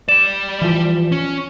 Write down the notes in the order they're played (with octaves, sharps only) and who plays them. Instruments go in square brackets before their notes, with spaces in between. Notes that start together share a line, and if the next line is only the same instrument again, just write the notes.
[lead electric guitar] G3 D5 [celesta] E7
[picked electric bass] E3 F3
[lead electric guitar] C#4